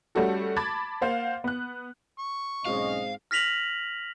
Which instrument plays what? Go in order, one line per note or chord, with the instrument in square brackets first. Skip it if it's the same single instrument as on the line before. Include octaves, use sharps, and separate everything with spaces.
[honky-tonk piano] G3 A3 C#4 F#4 A4
A5 B5 D6 G#6 A6
A#3 C5 F5 F#5
B3 F#6
[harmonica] C#6
[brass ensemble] B1 C#4 D#5 [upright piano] G#2 G#3 C4 [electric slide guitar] F5
[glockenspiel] F6 A#6 B6 F7 F#7